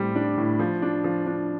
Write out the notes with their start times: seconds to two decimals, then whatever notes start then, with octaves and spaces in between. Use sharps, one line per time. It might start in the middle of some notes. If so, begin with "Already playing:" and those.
Already playing: A2 G3 C4
0.16 D4
0.38 A2
0.59 F3
0.82 D4
1.04 F3
1.27 D4